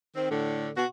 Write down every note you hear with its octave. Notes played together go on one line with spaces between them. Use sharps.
D#3 C4
A2 D3
B2 F#4